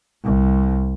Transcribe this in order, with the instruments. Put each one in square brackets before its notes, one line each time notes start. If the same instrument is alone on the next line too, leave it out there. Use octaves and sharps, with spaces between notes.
[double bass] C2